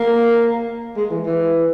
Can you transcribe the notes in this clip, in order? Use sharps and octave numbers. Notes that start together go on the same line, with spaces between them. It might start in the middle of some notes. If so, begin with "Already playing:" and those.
Already playing: A#3
G#3
E3
E3